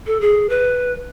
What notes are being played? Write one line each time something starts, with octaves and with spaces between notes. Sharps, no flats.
A4
G#4
B4